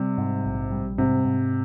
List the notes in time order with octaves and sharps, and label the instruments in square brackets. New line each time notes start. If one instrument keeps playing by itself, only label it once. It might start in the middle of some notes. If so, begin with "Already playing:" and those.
Already playing: [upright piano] C3 [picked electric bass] G3
[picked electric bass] G#2
A#1
G3
[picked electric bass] G#2 [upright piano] C3
[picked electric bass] G#2